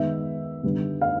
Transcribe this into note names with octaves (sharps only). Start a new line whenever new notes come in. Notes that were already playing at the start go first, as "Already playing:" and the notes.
Already playing: D#3 G#3 B3 E5
D3 G3 B3
F5